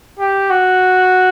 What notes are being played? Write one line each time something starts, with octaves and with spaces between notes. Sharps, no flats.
G4
F#4